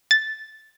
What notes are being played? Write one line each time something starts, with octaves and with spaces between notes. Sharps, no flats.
A6